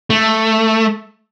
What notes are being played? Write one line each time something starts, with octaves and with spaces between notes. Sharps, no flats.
A3